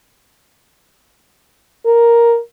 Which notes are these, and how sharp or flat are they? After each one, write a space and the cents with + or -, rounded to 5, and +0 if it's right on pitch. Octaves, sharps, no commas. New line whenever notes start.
A#4 +5